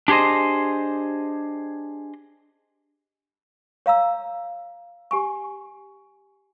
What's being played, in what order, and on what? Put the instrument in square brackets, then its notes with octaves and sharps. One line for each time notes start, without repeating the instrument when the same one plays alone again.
[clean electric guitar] D4 G4 G#4 C5 D#5
[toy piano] C#5 F5 A#5 E6
G4 G#5 C#6